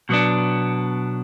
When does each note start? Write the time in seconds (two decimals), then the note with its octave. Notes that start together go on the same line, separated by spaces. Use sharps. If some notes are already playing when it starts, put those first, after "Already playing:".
0.09 B2 F#3 B3 D4